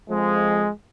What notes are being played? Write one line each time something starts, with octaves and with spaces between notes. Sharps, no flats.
F2 F3 G#3